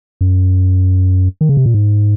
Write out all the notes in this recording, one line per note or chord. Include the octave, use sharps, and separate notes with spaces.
F#2
D#3
C#3
C3
A#2
G#2